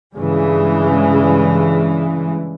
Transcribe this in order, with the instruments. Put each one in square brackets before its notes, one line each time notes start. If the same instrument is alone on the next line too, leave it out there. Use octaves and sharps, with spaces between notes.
[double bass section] G2 C#3 E3 G#3